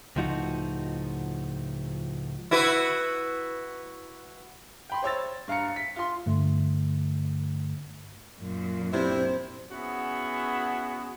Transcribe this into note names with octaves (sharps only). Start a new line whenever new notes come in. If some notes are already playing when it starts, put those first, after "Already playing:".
C#2 A2 F3 D#4 F#4
E4 F#4 B4
G5 B5 C6
C5 C#5 E6 A6
G2 F5 A#5 C#7
B6
F4 C6
G2 D3 A3
F#2 A#2
C3 C4 D4 E4
B3 C#4 E4 F#4 G#4